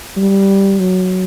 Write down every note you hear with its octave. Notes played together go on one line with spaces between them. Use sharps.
G3
F#3